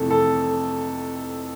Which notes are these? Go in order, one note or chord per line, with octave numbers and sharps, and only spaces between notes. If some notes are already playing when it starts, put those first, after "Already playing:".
Already playing: F2 C3 E3 A3 A4
A4